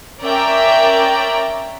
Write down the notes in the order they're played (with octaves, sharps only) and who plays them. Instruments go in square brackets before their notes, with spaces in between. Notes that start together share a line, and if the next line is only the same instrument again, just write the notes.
[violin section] C#4 A#4 D5 E5 G5 A#5